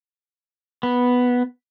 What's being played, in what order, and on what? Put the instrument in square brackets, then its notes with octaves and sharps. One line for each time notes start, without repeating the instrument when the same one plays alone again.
[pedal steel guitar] B3